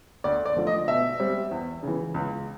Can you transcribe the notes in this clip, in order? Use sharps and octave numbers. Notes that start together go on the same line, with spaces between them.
D2 D5
D5
D3 F3 A3
D#5
B2 E5
G3 C4
E2
C#3 E3
C#2